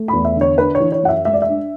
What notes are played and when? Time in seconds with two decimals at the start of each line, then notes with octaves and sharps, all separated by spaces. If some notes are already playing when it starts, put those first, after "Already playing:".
Already playing: A3
0.08 E2 B5
0.25 E5
0.36 D3
0.41 C#5
0.58 D4 B4
0.75 C#5
0.80 E3
0.92 C#5
1.03 F#2 F#5
1.09 E5
1.25 G#3 E5
1.33 D5
1.42 E5
1.48 D4